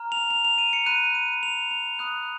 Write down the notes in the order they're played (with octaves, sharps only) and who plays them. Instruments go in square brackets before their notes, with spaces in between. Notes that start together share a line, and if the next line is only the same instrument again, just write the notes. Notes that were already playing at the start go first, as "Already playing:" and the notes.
Already playing: [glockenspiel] A#5 F6
F7
F7
F7
D#7
C#7
B5 F#6 D#7
D#7
F7
F7
B5 D#6 F#6